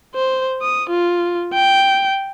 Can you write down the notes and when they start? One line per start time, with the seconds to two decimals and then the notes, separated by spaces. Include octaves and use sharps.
0.15 C5
0.62 D#6
0.90 F4
1.53 G5